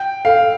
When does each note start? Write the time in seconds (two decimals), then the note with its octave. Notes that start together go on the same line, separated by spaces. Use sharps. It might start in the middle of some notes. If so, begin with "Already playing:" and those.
Already playing: G5
0.25 A4 F5